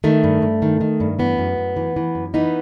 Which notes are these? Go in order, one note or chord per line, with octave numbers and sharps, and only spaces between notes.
D#3 A3
G2
G2
D#3
D#3
G2
E3 B3
F#2
F#2
E3
E3
F#2
E3 B3 D#4